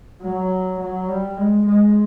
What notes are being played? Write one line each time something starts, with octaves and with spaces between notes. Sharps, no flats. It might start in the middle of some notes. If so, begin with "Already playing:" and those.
F#3
F#3
G3
G#3
G#3